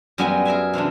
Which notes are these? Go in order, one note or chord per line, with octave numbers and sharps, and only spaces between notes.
F#2 G3 G#3 B3 B4 G#5
G#4 A#4 E5 G#5
C3 E3 G#3 D4